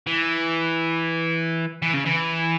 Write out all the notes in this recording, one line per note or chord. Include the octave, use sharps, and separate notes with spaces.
E3
E3
C#3
E3